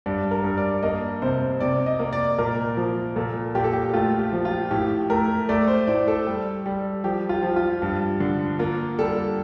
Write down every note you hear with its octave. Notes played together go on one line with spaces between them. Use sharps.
G2 D5
A#4
G2
D5
A#3 D#5
C3 C5
C3 D5
D#5
A#3
D5
A#2 A#4
F3
A#2 A4
A#2 G4
A4
G4
A3 F4
G4
F3
F4
A2 G4
A3 A#4
A3 D5
C5
A2 D5
A4
G3
G3
F3 G4
F4
F3
F4
G2
D3
A#3 F4
G3 A4